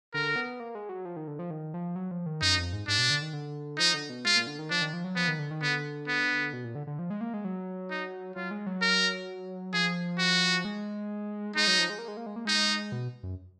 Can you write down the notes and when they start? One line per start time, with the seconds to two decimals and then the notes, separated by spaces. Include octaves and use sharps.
0.14 D3 A#4
0.36 B3
0.60 A#3
0.75 G#3
0.89 F#3
1.05 F3
1.16 D#3
1.27 D3
1.39 F3
1.51 D#3
1.74 F3
1.96 F#3
2.11 F3
2.26 D#3
2.41 F#2 D#4
2.58 F2
2.73 G#2
2.88 G#2 D4
2.98 B2
3.10 D3
3.22 D#3
3.33 D3
3.79 F3 D#4
3.94 D3
4.09 B2
4.25 G#2 F4
4.36 A#2
4.47 D3
4.59 D#3
4.70 F3 D4
4.82 D#3
4.93 F3
5.04 F#3
5.16 F3 B3
5.28 D#3
5.39 D3
5.51 D#3
5.62 D3 B3
6.07 B3
6.53 B2
6.64 A#2
6.75 D3
6.87 D3
6.99 F3
7.10 G#3
7.21 A#3
7.34 G#3
7.45 F#3
7.90 D#4
8.36 F#3 F4
8.51 G#3
8.66 F#3
8.81 A#4
9.73 F3 G#4
10.18 F#4
10.64 G#3
11.56 G#3 D#4
11.67 F#3
11.79 F3
11.90 G#3
11.99 A#3
12.08 G#3
12.17 A#3
12.26 G#3
12.36 A#3
12.45 G#3 D#4
12.92 B2
13.23 F#2